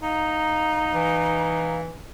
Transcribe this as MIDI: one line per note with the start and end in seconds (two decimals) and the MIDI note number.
0.03 1.99 63
0.03 1.81 77
0.03 1.74 82
0.93 1.93 52